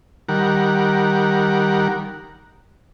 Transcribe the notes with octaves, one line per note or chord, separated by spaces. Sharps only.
D#3 G3 A#4 F#5